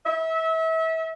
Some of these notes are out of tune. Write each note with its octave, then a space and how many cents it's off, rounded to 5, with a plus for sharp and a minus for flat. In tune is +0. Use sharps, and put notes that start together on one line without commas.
E5 -30